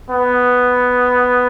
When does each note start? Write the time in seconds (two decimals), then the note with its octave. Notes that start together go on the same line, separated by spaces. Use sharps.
0.10 B3